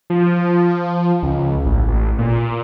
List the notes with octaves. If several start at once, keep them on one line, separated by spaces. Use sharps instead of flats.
F3
C#2
A1
A1
A#2